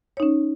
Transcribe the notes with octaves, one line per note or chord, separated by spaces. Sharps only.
C#4 D#4 C#5